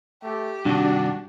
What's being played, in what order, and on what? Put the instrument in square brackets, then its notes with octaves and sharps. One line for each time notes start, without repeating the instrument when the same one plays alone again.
[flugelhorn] A3 [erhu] G4
[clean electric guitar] G2 C3 D#3 [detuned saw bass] D4 [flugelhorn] F#4